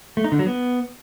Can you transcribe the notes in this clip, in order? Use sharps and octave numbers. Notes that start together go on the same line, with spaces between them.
A3
D#4
D3
F#3
B3